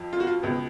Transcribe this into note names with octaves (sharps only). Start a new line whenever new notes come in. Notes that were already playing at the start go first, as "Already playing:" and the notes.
Already playing: F2 F3
F4
F#4
F4
C#2 B2 B3